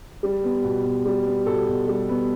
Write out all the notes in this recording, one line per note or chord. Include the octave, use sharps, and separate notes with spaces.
G3
B3
B2
B2
G3
B3
B2 A4
B2
G3
B3